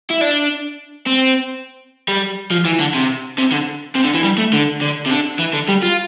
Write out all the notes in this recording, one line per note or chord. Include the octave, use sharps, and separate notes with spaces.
E4
D4
C4
G3
F3
E3
D3
C3
C3
D3
C3
D3
E3
G3
A3
D3
D3
C3
D3
E3
D3
G3
F4